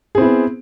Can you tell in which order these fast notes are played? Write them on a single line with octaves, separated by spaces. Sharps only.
G#4 C4 E4 B3